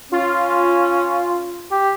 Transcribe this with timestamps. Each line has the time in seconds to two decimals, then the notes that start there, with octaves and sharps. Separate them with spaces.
0.12 C#4 F4
1.71 G4